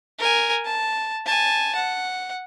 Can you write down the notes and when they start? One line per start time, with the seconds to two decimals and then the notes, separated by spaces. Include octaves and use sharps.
0.19 A#4 G#5
0.65 A5
1.25 G#5 A5
1.75 F#5